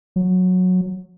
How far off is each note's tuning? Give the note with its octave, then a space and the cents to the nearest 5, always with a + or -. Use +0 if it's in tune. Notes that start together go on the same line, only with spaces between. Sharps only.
F#3 -15